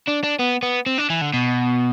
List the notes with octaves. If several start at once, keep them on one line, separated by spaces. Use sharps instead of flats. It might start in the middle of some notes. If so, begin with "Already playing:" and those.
D4
D4
B3
B3
C4
D4
E3
D3
B2